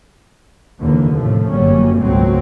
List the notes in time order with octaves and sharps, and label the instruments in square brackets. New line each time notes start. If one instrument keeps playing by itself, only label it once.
[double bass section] F1 D#2 B2 D3 E3 A#3
A2 C3 F3 A3
G1 F#2 F#3 G3 A#3 C#4
G#1 C#2 A#2 F#3 A3 C4